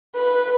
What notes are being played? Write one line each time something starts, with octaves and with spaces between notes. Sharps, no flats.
B4